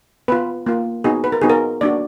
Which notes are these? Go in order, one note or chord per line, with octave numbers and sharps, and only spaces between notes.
B3 F4 B4
A#3 F4
B3 D#4 F#4 G#4
B4
A#4
B3 D#4 F#4 G#4
A#4
A#3 D4 F#4 D5